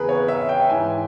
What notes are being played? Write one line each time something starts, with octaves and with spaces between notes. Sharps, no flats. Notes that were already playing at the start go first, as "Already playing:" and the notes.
Already playing: E2 C#3 E3 G#4 A#4 B4
C#5
E5
G5
G#2 E3 G#5